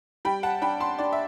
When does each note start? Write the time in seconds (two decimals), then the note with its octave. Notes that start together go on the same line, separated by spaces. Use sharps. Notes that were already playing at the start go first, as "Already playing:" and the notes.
0.25 G3 G5 B5
0.43 F#5 A5
0.62 D4 G5 B5
0.80 A5 C6
0.98 D4 D5
1.13 E5